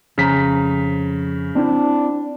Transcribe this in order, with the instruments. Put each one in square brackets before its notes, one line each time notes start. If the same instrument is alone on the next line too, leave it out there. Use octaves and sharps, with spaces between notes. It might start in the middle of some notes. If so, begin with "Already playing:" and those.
[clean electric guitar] F2 A#5 [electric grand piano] C#3 B6
[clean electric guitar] C4 E4 [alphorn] D4